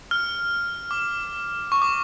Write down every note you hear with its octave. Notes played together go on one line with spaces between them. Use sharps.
F6
D6
C#6
D6